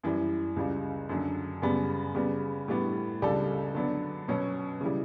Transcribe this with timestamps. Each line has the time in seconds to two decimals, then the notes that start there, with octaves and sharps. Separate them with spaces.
0.03 F#2 E3 G3
0.56 C#2 C#3 G3
1.09 F#2 D3 F#3
1.62 F#2 C#3 G3 B3
2.15 C#3 G3 B3
2.68 A2 G3 B3 D4
3.22 C#2 C#3 G3 D4 A4
3.74 D3 F#3 B3 D4
4.28 B2 F#3 C#4
4.81 C#3 E3 G3